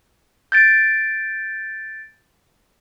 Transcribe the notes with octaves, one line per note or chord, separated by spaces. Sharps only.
G6 A6 D7